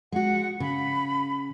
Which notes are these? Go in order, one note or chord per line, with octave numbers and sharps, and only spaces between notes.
G#3 F#4 F#5
C#3 B5